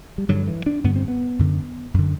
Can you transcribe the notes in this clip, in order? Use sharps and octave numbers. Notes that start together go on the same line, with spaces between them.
G3
G2 D3 F#3
E3
D4
G2 D3 B3
C4
B3
F#2 D3
F#2 D3